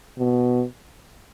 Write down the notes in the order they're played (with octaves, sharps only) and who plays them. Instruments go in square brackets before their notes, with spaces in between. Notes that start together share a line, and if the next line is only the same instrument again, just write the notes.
[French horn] B2